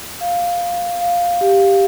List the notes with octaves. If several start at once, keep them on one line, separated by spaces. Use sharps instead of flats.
F5
F5
F5
G4